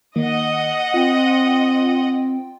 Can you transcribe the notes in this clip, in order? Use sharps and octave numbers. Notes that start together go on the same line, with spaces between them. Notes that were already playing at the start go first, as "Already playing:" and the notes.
D#3 A#3 D#5 F#5
C4 F4 G5